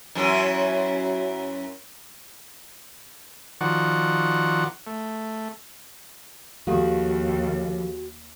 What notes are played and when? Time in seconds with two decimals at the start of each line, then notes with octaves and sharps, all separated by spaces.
0.15 F#2 E3 C#4
3.61 D#3 F3 F#4 D5 F#5
4.87 A3
6.67 D#2 F3 F#4 G4 A4 F5